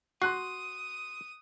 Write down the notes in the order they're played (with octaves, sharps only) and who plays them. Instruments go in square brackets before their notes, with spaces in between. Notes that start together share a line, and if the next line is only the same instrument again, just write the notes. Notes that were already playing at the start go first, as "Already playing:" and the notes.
[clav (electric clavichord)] F#4 [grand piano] C6 F#6 C7 [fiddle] D#6